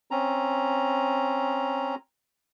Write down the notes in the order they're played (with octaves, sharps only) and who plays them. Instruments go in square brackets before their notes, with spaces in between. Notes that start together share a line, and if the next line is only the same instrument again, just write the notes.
[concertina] C4 C#4 A#5